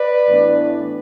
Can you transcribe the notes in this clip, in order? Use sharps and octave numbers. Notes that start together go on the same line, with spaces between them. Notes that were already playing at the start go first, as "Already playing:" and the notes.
Already playing: B4 D5
A2 E3 B3 D4